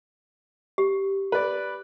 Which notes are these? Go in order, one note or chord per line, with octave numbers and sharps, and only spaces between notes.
G4
B4 D5